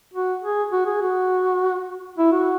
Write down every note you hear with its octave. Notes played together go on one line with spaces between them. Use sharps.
F#4
G#4
F#4
G#4
F#4
E4
F#4